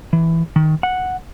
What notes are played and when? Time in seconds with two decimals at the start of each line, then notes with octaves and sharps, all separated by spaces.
0.13 E3
0.56 D#3
0.83 F#5